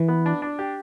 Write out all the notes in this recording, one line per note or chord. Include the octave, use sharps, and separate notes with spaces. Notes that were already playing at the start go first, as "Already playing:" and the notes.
Already playing: E3
B3
D4
D4
G4